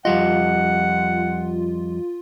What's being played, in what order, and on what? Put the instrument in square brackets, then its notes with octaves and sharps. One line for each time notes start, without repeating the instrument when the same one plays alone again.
[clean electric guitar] F2 G3 D#5 [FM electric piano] F4 [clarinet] F#5